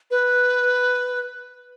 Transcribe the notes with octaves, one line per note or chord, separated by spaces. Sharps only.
B4